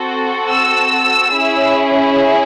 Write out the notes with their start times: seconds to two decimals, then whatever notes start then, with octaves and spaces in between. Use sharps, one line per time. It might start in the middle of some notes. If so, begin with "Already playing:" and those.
Already playing: C4 F#4 A4
0.50 E6
1.34 C#4 E4 G#4